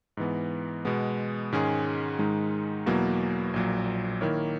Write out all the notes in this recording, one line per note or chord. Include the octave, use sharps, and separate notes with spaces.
G#2 E3 B3
B2 G#3 B3
G#2 D#3 G#3 C#4 G#4
G#2 D#3 G#3 D#4
E2 B2 F#3 A#3 E4
A#1 A#2 F#3
D#3 A#3 E4 A#4 C#5